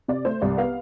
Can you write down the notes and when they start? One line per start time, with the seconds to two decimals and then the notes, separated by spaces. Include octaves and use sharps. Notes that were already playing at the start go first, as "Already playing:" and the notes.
0.08 C3 D5
0.25 A3 C5
0.42 C2 D5
0.58 B3 F5